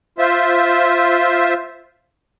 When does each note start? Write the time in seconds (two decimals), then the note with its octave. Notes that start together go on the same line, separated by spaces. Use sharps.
0.18 F4 C5 E5